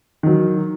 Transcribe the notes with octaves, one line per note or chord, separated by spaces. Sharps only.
D#3 F#3